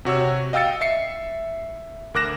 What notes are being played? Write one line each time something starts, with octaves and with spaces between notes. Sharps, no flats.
C3 F#4 C#5 E6
D#5 F5 G5 E6 A6 C#7
E5 C7 C#7
D2 A#4 D6 F#6 A#6 E7